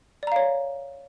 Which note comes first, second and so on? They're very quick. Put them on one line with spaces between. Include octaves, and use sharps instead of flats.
D5 A#5 F5 C#5